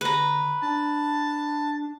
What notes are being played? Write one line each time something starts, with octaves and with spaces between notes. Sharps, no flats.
D3 B4 A#5
D4 A5